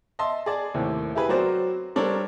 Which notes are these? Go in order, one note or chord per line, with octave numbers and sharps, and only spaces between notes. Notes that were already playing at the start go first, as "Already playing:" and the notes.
D#5 E5 A5 C6
G#4 D5 A5
D#2 A2 C3
E4 G4 G#4 B4
F#3 C4 F#4 A#4 C5 D5
G3 C4 D4 A4 A#4 C#5